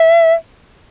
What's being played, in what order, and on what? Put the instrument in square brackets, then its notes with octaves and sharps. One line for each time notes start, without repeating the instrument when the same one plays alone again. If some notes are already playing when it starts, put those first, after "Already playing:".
Already playing: [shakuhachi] E5